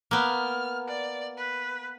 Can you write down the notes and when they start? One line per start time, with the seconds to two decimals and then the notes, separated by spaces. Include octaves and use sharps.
0.11 A#3 B3 F6
0.87 D5
1.37 B4